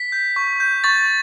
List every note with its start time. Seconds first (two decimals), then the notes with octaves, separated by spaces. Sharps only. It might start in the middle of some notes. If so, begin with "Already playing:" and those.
Already playing: B6
0.12 G6
0.36 C#6
0.60 G6
0.84 C#6 A6